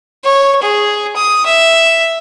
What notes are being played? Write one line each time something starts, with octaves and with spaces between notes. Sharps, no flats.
C#5
G#4
D#6
E5